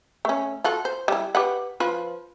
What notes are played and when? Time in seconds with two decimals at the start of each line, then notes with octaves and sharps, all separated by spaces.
0.25 A3 C#4
0.64 F4 F#4 A4
0.85 C5
1.08 G3 E4
1.35 G4 B4 F#5
1.80 F3 F4 B4